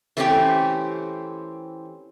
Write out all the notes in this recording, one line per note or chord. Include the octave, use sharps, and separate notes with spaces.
E3 A3 C4 C#4 G4 G5